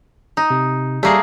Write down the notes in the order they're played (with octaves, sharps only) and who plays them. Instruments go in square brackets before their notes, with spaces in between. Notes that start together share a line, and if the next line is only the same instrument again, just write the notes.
[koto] D#4
[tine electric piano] C3
[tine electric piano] G3 [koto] A3 A#3 G#4